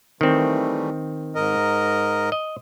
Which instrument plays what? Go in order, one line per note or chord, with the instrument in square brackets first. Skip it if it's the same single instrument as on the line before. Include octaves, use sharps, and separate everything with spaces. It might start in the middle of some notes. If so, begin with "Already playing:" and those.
[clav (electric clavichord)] D#3 C4 [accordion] E3 G3 A3
[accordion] G#2 A#4 D#5
[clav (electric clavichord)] D#5